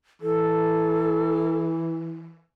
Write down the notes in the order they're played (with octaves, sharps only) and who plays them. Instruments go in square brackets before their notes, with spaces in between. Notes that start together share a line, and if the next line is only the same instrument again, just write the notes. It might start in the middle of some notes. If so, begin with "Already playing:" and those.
[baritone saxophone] E3 [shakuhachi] A4